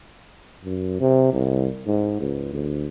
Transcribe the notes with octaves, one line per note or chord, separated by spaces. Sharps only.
F#2
C3
C2
G#2
C#2
D2